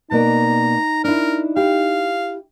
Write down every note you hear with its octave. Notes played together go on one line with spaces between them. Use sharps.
B2 A#3 D#4 D5 A#5
D4 E4 A#4
E4 G4 F5